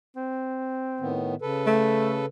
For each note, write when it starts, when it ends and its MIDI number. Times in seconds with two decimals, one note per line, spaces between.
0.16 1.20 60
1.00 1.35 45
1.00 1.35 51
1.00 1.35 59
1.42 2.26 49
1.42 2.26 69
1.42 2.26 71
1.67 2.23 57